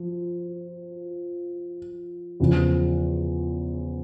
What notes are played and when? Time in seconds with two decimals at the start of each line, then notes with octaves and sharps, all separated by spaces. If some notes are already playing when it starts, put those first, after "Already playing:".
Already playing: F3
2.40 E2 C#3 F3